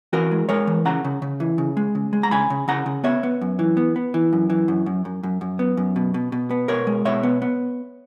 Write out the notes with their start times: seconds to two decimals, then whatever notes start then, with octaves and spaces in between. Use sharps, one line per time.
0.13 E3 F#4 A#4
0.31 G#3
0.49 G#3 A#4 C#5
0.67 E3
0.85 C#3 F#5 A#5
1.04 C#3
1.22 C#3
1.40 E3
1.58 C#3
1.77 G#3
1.95 C#3
2.13 G#3
2.23 A#5
2.31 C#3 G#5 B5
2.50 C#3
2.68 C#3 F#5 A#5
2.86 C#3
3.04 B3 C#5 E5
3.23 B3
3.41 F#2
3.59 E3
3.77 B3
3.96 B3
4.14 E3
4.33 F#2
4.50 E3
4.68 F#2
4.86 F#2
5.05 F#2
5.23 F#2
5.41 F#2
5.59 B3
5.77 F#2
5.96 B2
6.14 B2
6.32 B2
6.51 B3
6.68 B2 A#4 C#5
6.87 G#3
7.05 B2 C#5 E5
7.23 B3
7.42 B3